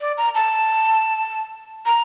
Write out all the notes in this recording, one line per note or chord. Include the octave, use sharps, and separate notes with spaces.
D5
A#5
A5
A#5